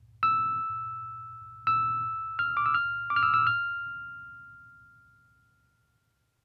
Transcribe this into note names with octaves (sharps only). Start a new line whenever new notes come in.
E6
E6
F6
D6
E6
F6
D6
F6
E6
E6
F6